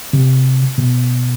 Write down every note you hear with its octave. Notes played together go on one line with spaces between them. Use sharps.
C3
B2